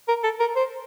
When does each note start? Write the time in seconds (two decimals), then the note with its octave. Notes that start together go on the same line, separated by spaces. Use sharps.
0.08 A#4
0.24 A4
0.40 A#4
0.56 C5